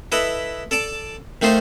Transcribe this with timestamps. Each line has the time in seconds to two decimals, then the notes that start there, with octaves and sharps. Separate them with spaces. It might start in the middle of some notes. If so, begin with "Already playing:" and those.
0.12 E4 A4 B4 D#5
0.71 A4 D5 A5 D6
1.42 D#3 A3 D#4 F4 C5